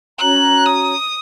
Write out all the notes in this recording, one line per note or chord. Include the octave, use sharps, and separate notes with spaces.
C#4 F#4 C#5 A#5 F#6
D#6